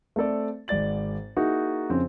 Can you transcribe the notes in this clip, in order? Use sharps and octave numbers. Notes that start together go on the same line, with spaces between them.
A3 C4 A4 D5
G#1 G#2 D5 A6 F#7
A#3 D#4 E4 F#4 G#4
F2 C#3 C4 C#4